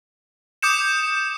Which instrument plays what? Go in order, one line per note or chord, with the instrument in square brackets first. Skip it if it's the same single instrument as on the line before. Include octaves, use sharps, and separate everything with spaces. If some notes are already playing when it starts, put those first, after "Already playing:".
[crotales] D6 D#6 G6 C#7 E7